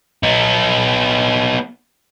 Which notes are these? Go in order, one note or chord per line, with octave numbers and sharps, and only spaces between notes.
B3 D#4